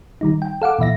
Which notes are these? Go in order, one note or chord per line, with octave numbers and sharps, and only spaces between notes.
D#3 G3 D#4
G5
A4 F5 F#5 D6
A#2 E3 E5 A#6